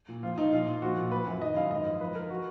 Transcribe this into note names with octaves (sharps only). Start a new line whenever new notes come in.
A#2
F3 F4
F3 D#4
A#2 F4
A#2
F3 F#4
A#2
F3 B4
F#2
D#3 D#5
F#2 F5
G#2 D#5
F3
F3 B4
F3 A#4
F#4